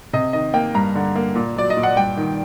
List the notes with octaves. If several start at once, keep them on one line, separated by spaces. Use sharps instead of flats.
C3 D#5
D#3 D#5
A#3 G5
G2 A#5
D3
A#3
A#2
F#3 D5
D#5
A#2
F#5
G2 G5
D#3